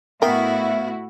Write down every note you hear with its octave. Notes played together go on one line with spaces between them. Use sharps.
A2 B3 E4 F#4 A#4 E5 F5 G5